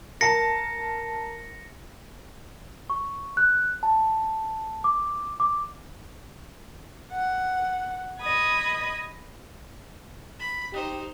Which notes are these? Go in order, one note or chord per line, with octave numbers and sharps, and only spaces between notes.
A#4 A5 A#6 C#7
C#6
F#6
A5
D6
D6
F#5
D#5 B5 D#6 G#6
B5
D#4 G4 C5